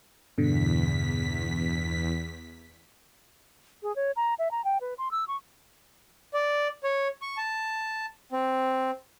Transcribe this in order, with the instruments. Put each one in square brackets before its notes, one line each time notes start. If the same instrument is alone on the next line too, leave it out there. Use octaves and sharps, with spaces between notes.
[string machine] E2 B6 [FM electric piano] G2 B2 D3
[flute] G#4
C#5
A#5
E5
A#5
G5
B4
C6
E6
C#6
[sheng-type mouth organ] D5
C#5
C#6
A5
C4